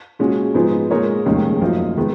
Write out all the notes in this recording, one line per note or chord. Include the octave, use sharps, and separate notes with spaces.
A#2 G#3 C#4 F#4
G#2 F3 B3 D#4 G#4
A#2 G#3 D#4 A#4 C#5
F1 D#2 D#3 G#3 C#4
F#2 F3 A#3 D#4
D#3 G#3 B3